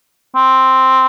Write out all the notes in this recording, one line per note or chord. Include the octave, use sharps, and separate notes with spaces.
C4